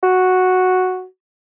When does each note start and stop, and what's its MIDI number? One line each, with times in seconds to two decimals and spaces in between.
0.03 1.05 66